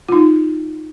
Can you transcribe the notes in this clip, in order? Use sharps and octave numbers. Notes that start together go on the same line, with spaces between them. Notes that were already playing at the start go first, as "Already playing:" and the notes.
F4
D#4